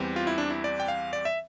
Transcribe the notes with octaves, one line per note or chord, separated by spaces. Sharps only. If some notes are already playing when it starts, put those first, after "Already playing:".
Already playing: E2 E3 G3 C4
F4
E4
D4
E4
D5
G5
F5
D5
E5